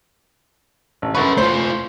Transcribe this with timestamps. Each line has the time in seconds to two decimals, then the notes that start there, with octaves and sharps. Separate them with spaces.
1.02 A1
1.15 F#2 A4 B4 C#6
1.38 A3 F4 C5